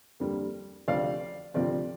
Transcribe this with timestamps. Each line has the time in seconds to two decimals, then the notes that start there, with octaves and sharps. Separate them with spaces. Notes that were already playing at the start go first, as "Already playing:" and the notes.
0.20 F2 D3 G3 A#3
0.88 D2 C3 F3 C4 D5 F5
1.54 D2 C3 F3 C4 D5